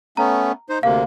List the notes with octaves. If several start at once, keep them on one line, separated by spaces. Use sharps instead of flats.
A3 B3 C#4 A#5
D#4 C5
D2 C3 A#3 F5